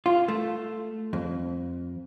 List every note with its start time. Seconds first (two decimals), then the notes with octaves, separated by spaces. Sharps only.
0.06 F4
0.28 A3
1.13 F2